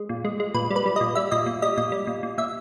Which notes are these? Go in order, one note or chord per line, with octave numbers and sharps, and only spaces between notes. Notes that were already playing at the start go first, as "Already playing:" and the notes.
Already playing: G#3
A#2
G#3
G#3
A#2 B4
G3
B4
G3
A#2 D#5
G3 E5
A#2 D#5
A#2
G3 D#5
A#2 D#5
G3
A#2
A#2
A#2 E5